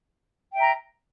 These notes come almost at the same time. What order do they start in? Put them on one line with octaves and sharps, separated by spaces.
G5 E5 A#5